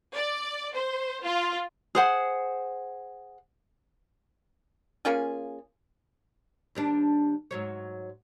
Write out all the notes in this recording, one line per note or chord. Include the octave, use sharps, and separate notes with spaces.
D5
C5
F4
G#4 C5 F#5
A#3 C#4 F4 G#4
D#2 G3 D4
G#2 F#3 C#5